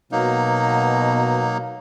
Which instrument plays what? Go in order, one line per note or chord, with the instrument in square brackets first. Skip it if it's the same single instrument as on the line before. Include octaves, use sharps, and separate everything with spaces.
[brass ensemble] B2 [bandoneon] F#3 A#3 D#4